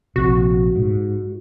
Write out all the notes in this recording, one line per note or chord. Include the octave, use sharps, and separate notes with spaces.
A#1 C3 F#4
G#2